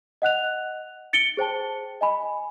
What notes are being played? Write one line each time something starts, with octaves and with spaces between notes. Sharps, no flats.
D#5 F#5 F#6 F7
A6 C#7 D7 G7
G#4 C5 G5 A5
D#5 G#5 B5